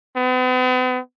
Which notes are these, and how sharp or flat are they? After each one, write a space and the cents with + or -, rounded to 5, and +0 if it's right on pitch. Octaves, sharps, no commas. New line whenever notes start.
B3 +45